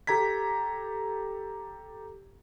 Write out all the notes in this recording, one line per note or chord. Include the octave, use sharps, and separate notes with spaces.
G4 A4 A#5 G#6 B6